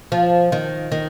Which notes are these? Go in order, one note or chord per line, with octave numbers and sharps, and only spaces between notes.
F3
D#3
D#3